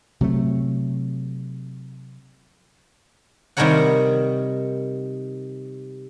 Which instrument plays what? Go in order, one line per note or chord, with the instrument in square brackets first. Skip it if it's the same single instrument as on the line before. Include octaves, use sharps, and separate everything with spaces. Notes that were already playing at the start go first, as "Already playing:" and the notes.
[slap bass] C3 F#3 A3
[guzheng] C3 D#3 G3 A#4 C#5 F#5